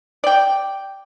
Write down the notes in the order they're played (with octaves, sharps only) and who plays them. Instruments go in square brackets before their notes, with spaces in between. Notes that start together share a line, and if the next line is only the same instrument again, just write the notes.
[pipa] D5 G5